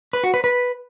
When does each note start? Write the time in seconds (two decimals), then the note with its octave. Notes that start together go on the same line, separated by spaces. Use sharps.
0.13 B4
0.24 F#4
0.34 B4
0.44 B4